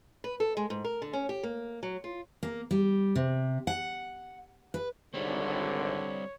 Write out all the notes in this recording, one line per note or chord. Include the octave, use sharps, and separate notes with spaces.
B4
A4
G#3
G#2
A#4
D3
C#4
G4
A#3
F#3
F4
A#3
G3
C3
F#5
B4
G#1 D3 G3 C4 C#5